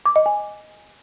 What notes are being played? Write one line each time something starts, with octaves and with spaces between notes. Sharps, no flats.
D6
D#5
G#5